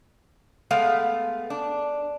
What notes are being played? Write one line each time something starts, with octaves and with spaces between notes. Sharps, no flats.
G#3 A3 B3 F5
D4